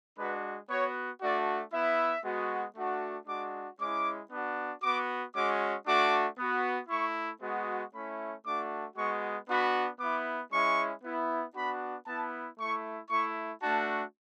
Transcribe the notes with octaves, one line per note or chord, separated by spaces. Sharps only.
G#3 D4 F#4 B4
B3 F#4 C#5
A3 D4 F#4 D5
B3 E4 E5
G#3 B3 F#4
A3 D4 F#4
G#3 D4 F#4 D6
G#3 C#4 E4 D6
B3 D4 F#4
B3 F#4 D6
G#3 C#4 F#4 D6
A3 D4 F#4 D6
B3 F#4
A3 E4 C#6
G#3 B3 F#4
A3 C#4 E4 B5
A3 D4 F#4 D6
G#3 B3 F#4 C#6
B3 D4 F#4 B5
B3 E4 D6
G#3 C#4 E4 C#6
B3 E4
B3 D4 F#4 B5
B3 E4 A5
A3 E4 C#6
A3 E4 C#6
A3 D4 F#4 A5